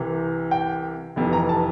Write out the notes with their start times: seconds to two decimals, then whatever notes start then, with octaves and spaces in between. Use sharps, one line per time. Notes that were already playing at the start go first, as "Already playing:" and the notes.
Already playing: C2 C3 E3
0.51 G5
1.16 F1 F2 C3 E3
1.33 A#5
1.49 A5